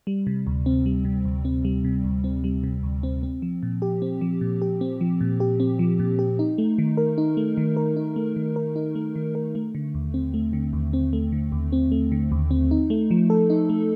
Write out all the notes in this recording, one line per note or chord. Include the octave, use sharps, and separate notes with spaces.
G3
C3
D2
C4
G3
C3
D2
C4
G3
C3
D2
C4
G3
C3
D2
C4
C4
F3
A#2
G4
C4
F3
A#2
G4
C4
F3
A#2
G4
C4
F3
A#2
G4
D#4
A3
D#3
A#4
D#4
A3
D#3
A#4
D#4
A3
D#3
A#4
D#4
A3
D#3
A#4
A3
D3
D#2
C4
A3
D3
D#2
C4
A3
D3
D#2
C4
A3
D3
D#2
C4
D#4
A3
F3
A4
D#4
A3